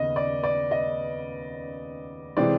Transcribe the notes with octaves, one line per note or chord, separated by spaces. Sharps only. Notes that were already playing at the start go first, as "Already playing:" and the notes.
Already playing: D#2 C#3 B3 D#5
D5
D5
D#5
C3 E3 G#3 C4 D5